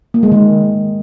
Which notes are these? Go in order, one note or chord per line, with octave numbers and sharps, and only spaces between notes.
A#3
G#3
D#3